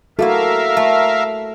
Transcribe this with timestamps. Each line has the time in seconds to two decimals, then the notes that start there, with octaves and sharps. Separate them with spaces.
0.19 A3 A#3 E4 F#4 A4 A#4 E5 F5
0.77 A3